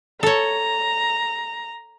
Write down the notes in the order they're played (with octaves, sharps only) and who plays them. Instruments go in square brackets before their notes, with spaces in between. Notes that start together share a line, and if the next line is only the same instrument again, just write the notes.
[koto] A4 C#5 [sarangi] A#5